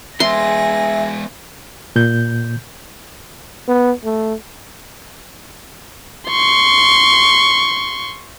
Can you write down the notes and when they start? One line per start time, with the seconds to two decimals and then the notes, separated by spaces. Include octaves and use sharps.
0.20 G#3 B3 G#4 E5 C6 A#6
1.96 A#2 G6
3.68 B3
4.04 A3
6.28 C6 C#6